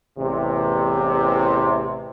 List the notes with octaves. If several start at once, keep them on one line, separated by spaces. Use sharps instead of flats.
A1 E2 C3